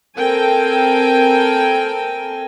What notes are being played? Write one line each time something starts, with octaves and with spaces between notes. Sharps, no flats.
C4 A4 A#4 G5 G#5